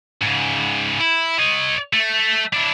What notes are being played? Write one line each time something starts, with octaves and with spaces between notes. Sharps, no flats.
G#2 C#3
E4
C#5 D#5
A3
D4 E4